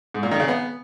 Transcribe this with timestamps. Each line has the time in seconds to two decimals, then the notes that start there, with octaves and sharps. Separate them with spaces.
0.14 G#2
0.23 A#2
0.31 D#3
0.40 C#3
0.48 B3